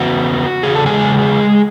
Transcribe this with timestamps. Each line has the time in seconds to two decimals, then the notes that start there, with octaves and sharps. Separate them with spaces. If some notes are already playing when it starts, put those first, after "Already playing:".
Already playing: E2 C#3 B3 E4 F#4
0.63 E2 C#3 G#4
0.75 A4
0.86 G#3 G#4